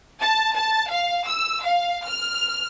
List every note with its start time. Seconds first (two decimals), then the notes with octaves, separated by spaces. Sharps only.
0.21 A5
0.56 A5
0.89 F5
1.27 E6
1.64 F5
2.06 F6